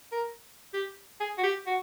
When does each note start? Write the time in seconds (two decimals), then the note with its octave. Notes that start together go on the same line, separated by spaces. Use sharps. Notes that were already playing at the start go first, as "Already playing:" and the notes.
0.12 A#4
0.74 G4
1.20 G#4
1.38 F#4
1.44 G4
1.67 F#4